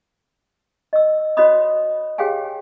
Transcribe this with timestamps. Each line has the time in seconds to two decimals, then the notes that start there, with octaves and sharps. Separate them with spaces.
0.93 D#5 E6
1.37 F#4 C5 C#5 D#5 B5 D#6
2.18 G4 G#4 C#5 F5 G5 G#5